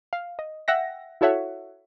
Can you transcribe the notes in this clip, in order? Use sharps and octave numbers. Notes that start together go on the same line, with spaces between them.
F5
D#5
E5 F#5 G5 A#6
E4 F#4 A4 C#5 E5 F#5